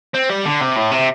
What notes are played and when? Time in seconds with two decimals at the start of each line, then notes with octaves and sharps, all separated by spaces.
0.15 C4
0.30 G3
0.45 D3
0.61 C3
0.76 A2
0.91 C3